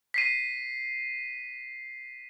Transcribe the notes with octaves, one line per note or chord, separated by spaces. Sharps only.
B6 C7 D#7